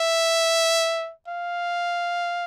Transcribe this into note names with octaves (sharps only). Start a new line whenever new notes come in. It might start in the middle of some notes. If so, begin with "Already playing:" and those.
Already playing: E5
F5